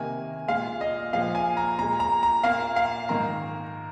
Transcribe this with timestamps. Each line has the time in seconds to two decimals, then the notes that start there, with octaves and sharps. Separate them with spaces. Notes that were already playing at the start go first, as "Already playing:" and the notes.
Already playing: C3 D#3 A#3 G#5
0.48 A#2 G#3 F5
0.81 D#5
1.13 A#2 F3 G#3 F5
1.35 G#5
1.57 A#5
1.79 A#2 G#3 A#5
2.00 A#5
2.23 A#5
2.44 A#2 A#3 F5
2.76 F5
3.09 G#2 D#3 A#3 A#5